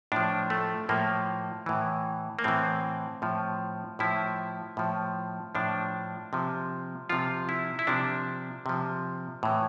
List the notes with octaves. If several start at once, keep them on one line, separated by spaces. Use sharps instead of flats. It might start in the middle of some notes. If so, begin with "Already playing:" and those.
A2 F3 D4
A3
A2 F3 A#3
A2 E3
A#3
A2 E3 C4
A2 F3
A2 F3 E4
A2 F3
A2 F3 D4
C3 F3
C3 F3 F4
E4
E4
C3 F3 D4
C3 F3
A2 E3